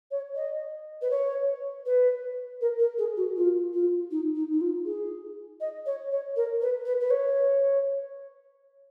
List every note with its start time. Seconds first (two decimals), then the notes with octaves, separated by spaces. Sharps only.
0.11 C#5
0.36 D#5
1.02 B4
1.11 C#5
1.86 B4
2.61 A#4
2.79 A#4
2.98 G#4
3.17 F#4
3.36 F4
3.73 F4
4.11 D#4
4.36 D#4
4.53 D#4
4.61 F4
4.85 G#4
5.61 D#5
5.86 C#5
6.11 C#5
6.36 A#4
6.62 B4
6.86 B4
7.00 B4
7.10 C#5